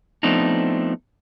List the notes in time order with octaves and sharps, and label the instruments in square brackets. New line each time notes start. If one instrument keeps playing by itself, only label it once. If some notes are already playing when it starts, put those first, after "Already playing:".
[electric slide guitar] F3 A3 B3 C4 D4 D#4